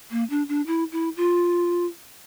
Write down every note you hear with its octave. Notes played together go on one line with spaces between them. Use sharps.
A#3
D4
D4
E4
E4
F4